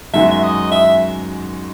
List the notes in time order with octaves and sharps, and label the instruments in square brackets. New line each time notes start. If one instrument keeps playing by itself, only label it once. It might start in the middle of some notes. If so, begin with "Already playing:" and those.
[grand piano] F#2 D#3 G#3 D#4 F#4 [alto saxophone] E5
[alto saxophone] E5
D#5
E5